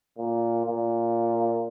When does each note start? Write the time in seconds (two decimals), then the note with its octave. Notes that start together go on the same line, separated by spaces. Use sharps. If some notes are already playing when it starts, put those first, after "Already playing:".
0.18 A#2
0.66 A#2